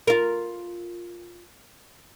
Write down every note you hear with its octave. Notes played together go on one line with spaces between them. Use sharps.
F4 A#4